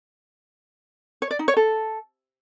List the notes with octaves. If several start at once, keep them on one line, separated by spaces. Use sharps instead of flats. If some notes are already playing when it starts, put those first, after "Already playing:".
C#5
D5
D#4
C#5
A4